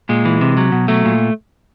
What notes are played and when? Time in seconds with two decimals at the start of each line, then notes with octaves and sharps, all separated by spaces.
0.09 A#2 G#3
0.25 E3
0.41 C3
0.57 F#3
0.72 B2
0.88 F#3 A3
1.05 A#2